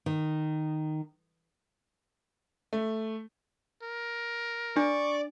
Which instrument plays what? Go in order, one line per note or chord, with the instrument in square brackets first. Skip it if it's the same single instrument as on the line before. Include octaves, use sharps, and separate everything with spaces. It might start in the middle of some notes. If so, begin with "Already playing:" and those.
[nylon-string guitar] D#3
[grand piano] A3
[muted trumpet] A#4
[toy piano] D4 [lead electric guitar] D5 [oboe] C#6